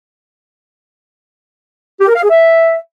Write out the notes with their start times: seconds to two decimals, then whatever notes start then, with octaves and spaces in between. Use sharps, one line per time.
2.01 G4
2.08 A#4
2.15 F5
2.23 G#4
2.30 E5